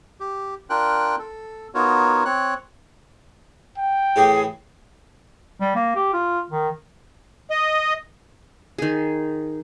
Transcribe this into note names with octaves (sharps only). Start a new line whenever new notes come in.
G4
D4 F4 A#4 G5 F#6
A4
B3 D#4 F4 F#4 A#4 C#5
C4 C#5 F#6
G5
A2 E3 G4 G#4
G3
A#3
G4
F4
D#3
D#5
D#3 G#4